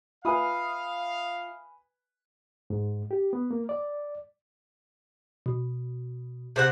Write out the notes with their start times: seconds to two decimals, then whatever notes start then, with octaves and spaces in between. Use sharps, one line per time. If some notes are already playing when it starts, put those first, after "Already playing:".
0.25 F4 B4 E5 F5 G#5 B5 D#6
2.70 G#2
3.11 G4
3.33 B3
3.51 A#3
3.69 D5
5.46 B2
6.56 C3 C5 F#5